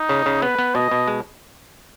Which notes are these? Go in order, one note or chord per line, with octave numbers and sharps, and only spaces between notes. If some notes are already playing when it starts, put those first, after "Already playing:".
Already playing: D#4
C#3
C#3
B3 B4
B3
B2 D#5
B2
G#3